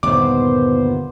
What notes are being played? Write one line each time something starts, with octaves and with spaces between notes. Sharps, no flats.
G1 D#2 A#2 B3 C5 D6